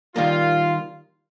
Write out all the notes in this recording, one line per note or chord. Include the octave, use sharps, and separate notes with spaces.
D#3 G3 A#3 F4